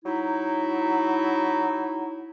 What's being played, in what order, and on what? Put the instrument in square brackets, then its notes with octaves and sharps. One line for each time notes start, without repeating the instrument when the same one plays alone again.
[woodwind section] F#3 D#4 E4